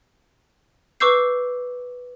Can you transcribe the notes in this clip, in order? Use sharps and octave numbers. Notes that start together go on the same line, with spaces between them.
B4 C#6 D6 E6 G6 C7